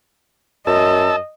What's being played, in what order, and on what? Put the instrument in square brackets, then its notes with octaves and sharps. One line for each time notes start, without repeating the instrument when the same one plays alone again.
[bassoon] F#2 [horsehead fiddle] D#5 [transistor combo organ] A5 E6